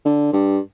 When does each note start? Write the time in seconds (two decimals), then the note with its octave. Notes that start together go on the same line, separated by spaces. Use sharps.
0.05 D3
0.33 G2